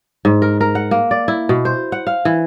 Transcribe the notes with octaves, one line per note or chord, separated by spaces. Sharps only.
G#2
A#4
A#4
F#5
A#3
D5
E4
B2
C5
F#5
F5
E3